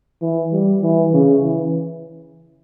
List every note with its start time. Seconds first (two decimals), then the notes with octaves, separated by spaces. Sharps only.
0.21 E3
0.52 G3
0.82 E3
1.13 C#3
1.43 E3